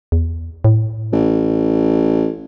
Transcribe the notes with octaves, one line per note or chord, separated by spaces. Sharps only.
E2
A2
A1